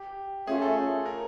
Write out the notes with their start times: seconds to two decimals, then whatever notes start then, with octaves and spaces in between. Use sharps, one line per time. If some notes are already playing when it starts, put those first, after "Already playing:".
Already playing: G4
0.47 A3 C#4 F4 G#4
0.62 A4
1.06 A#4